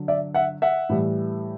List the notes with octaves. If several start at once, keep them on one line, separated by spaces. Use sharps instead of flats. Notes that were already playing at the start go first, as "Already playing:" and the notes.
Already playing: D3 F#3
D5 E5
E5 F#5
E5 F#5
A2 E3 G3